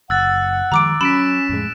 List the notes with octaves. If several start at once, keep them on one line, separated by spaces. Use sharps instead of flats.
F#1 F#5 E6 F#6 A6
D#3 F3 G#3 A#5 D6 D7
F#3 C#4 B5 B6 D7 E7
F2 A2 G#3